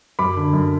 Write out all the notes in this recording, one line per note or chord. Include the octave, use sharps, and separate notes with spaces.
F#2 B5 D6
D3
F#2